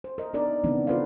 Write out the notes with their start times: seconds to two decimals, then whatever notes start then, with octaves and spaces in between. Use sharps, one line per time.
0.04 C5
0.18 A#4 D#5
0.33 B3 D4 D#4 A#4 D5
0.64 C#3 E3 B3 C4 D4 D#4
0.87 F4 A4 B4 C5 D5 F5